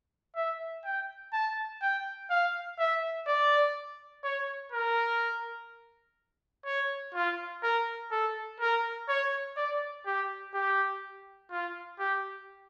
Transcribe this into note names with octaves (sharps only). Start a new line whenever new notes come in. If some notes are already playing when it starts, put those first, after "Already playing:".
E5
G5
A5
G5
F5
E5
D5
C#5
A#4
C#5
F4
A#4
A4
A#4
C#5
D5
G4
G4
F4
G4